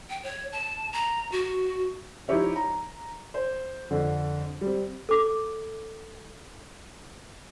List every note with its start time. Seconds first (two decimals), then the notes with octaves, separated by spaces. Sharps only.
0.10 G5
0.23 C#5
0.52 A5
0.93 A#5
1.32 F#4
2.28 F3 D#4 E4 G4 C#5 E5
2.56 A#5
3.34 C5
3.91 F2 D3
4.61 G3 C4
5.09 A4 D6